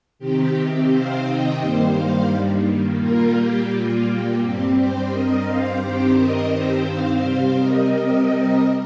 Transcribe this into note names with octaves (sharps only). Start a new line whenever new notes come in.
C3 D#3 C4 G4
C5 F5
D#5 G5
G2 D#3 G3 A#3 G4 C5
C5 F5
A#2 G3 A#3 F4 A#4
G4
F4
G4
G2 G3 C4 G4
G4 C5
A#4 D#5
C5 F5
G2 D#3 C4 G4 C5
A#4 D#5
G4 C5
C5 F5
C3 G3 C4 C5 F5
A#4 D#5
A#4 D#5